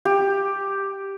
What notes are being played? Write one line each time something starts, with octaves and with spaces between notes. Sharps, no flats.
G4